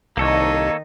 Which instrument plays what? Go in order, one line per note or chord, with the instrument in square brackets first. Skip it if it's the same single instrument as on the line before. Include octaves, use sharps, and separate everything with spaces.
[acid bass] C2 [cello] D#3 D#4 [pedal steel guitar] A#3 A4 C#5